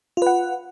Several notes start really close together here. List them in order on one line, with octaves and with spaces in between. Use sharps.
F4 B4 F#5